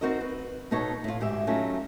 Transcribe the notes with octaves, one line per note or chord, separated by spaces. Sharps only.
C4 D#4 F#4 A#4 D#5
B4
B2 B3 D#4 A4 C#5
A2 F4
D2 G#2 G4 E5
F#3 A3 C#4 D#4 F4